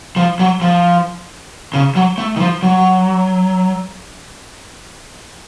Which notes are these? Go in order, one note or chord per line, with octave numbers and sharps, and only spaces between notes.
F3
F#3
F3
C#3
F#3
A3
D#3
F3
F#3